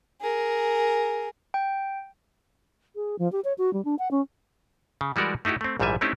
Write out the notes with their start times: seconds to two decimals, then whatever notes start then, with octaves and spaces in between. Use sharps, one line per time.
0.21 G#4 A#4
1.54 G5
2.95 G#4
3.19 F3
3.32 G4
3.44 C#5
3.58 F#4
3.73 G3
3.85 D4
3.99 F#5
4.11 C#4
5.01 C#3
5.16 E3 G3 G#3 F#4 A#4 D5
5.45 A3 D#4 E4 F#4 G4
5.61 A3 C4
5.80 A#1 G#2 E3 G3 E5 G#5
6.01 A3 C4 C#4 D#4 E4 G4